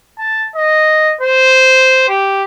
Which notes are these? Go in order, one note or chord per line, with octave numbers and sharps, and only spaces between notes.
A5
D#5
C5
G4